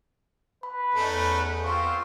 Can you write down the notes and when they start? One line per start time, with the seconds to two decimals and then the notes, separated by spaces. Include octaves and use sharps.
0.63 B4 B5
0.94 E2 A3 C#4 D#4
1.64 C4 F4 C#6